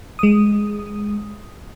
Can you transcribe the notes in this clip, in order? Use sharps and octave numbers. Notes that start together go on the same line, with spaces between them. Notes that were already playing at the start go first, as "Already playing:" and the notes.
G#3 D#6